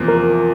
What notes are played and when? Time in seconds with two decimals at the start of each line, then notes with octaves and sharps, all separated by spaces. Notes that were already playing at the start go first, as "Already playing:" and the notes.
Already playing: E2 C3 F3 A#3
0.08 A#4